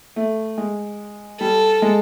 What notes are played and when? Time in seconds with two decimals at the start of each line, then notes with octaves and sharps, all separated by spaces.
0.16 A3
0.58 G#3
1.40 G3 A4
1.82 G#3